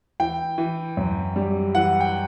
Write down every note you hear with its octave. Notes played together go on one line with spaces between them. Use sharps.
E3 G5
E3
F#2
G3
E3 F#5
G5